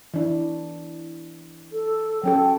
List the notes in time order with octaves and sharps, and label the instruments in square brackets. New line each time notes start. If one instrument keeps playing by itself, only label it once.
[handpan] E3 D4 E4
[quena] A4
[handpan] F#3 C#4 A4 [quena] G5